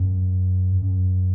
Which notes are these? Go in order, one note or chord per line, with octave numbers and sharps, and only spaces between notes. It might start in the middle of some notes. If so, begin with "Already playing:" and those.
Already playing: F#2
F#2